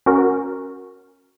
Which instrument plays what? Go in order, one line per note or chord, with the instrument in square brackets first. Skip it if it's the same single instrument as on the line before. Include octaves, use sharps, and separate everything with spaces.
[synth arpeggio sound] C#4 F#4 A#4